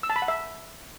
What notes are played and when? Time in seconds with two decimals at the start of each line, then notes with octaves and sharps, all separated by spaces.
0.03 E6
0.10 A5
0.16 B5
0.22 F#5
0.28 E5